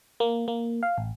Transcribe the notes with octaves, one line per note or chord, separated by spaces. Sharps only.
A#3
A#3
F5
A1